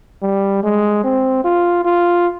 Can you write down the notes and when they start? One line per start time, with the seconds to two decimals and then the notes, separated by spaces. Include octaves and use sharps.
0.23 G3
0.63 G#3
1.04 C4
1.44 F4
1.85 F4